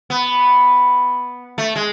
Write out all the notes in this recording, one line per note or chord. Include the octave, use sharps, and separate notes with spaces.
B3
A3
G#3